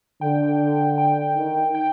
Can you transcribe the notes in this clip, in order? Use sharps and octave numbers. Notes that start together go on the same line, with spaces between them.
D3 G5
G5
D#3
G5